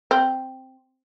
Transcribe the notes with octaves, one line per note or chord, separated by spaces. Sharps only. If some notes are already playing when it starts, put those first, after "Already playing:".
C4